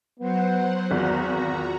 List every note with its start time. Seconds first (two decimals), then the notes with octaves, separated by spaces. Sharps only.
0.20 F#3 B3 C5 F#5
0.91 G#1 E2 F4 F#4 A#5